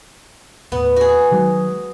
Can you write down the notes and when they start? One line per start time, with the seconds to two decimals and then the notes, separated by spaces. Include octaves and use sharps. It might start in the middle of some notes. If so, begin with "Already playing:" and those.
0.72 D#2 A2 B3
0.96 F#4 G#4
1.31 D#3 F#3 G#3